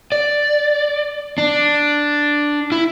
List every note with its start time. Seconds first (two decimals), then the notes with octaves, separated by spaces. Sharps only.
0.12 D5
1.38 D4
2.72 E4